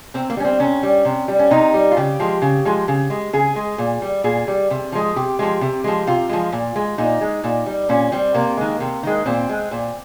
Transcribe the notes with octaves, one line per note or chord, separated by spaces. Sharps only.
C3 C4
A#3
G3 C#4
C4
C3 C#4
G3
C3
G3
C#4
C3 D#4
G3
F4
C#3 G4
F3 G#3
C#3
F3 G#3
C#3
G#3
C#3 G#4
G#3
A#2
G3
A#2 G#4
G3
C3
F3 G#3
C3 G4
F3 G#3
C3
F3 G#3
C3 F4
F3 G#3
A#2
G#3
A#2 D#4
G#3
A#2
G3
A#2 C#4
G3 C4
C3 A#3
D#3 G#3
C3
D#3 G#3
A#2 C4
G#3
A#2